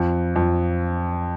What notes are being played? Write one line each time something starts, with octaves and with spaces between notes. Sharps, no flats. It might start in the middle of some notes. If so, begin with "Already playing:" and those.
Already playing: F2
F2